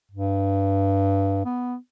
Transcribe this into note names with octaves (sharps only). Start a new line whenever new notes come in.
G2
B3